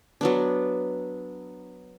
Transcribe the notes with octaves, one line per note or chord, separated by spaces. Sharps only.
F#3 B3 D4